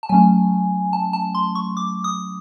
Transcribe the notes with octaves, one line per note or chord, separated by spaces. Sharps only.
A5
F#3 A3 C#4 G#5
A5
A5
C6
C#6
D6
D#6